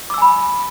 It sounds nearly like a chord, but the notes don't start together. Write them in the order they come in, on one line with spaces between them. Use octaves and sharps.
D6 E6 G#5 B5